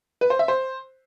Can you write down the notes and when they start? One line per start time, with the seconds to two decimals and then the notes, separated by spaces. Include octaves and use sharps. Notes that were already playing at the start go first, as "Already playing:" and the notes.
0.21 B4
0.30 C5
0.39 E5
0.48 C5